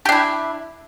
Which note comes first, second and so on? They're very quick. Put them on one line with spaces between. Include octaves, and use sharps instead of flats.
G4 D4 E4